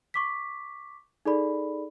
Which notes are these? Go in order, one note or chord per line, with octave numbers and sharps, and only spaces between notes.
C#6 D6 B6
D#4 G#4 A4 D5 B5